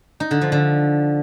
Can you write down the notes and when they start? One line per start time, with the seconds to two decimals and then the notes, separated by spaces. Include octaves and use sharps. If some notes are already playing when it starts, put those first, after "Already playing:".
0.20 D#4
0.31 D3
0.41 F3
0.52 D3